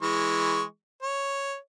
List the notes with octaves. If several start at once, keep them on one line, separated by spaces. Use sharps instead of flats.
E3 G#3 C#6
C#5